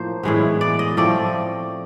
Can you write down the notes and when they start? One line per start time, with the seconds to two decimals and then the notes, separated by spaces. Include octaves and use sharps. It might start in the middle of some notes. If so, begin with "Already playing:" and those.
Already playing: A2 F3 A#3 C5
0.23 A2 E3 G#3 B3
0.61 D5
0.79 D#5
0.97 A2 F3 A3 C4 D5